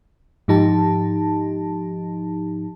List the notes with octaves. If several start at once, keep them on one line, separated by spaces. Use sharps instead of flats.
G#2 F3 D#4 G4 A5